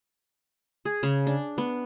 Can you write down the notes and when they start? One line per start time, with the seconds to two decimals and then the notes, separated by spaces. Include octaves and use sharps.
0.85 G#4
1.03 C#3
1.27 D4
1.58 B3